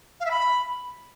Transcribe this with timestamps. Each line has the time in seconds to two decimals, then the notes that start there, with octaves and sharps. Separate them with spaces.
0.20 F5
0.26 E5
0.31 B5